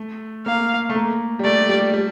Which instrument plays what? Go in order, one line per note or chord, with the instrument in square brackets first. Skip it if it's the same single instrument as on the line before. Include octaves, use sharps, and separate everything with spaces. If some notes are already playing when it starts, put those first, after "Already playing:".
Already playing: [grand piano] A3
[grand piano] A#3 [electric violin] F5
[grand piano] A3
A#3
G3
[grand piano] A3 [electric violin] D5
[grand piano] G3
G3